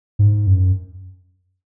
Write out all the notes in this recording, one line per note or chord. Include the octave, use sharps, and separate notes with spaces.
G#2
F#2